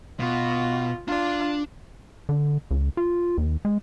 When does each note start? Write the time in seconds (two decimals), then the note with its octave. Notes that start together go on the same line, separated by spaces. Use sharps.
0.20 B2 F4
1.08 D4 F4 D5
2.29 D3
2.71 C#2
2.97 F4
3.38 D#2
3.65 G#3